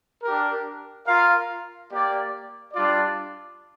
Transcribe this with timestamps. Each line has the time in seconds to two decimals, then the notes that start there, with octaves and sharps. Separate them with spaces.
0.23 D4 G4 A#4
1.07 F4 A#4 F5
1.91 A#3 G4 D5
2.74 G3 D4 F4 D5